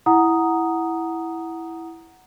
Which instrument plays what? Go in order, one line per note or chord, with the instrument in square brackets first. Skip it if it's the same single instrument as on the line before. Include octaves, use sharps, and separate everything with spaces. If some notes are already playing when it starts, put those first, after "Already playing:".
[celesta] E4 F#5 A#5 D#6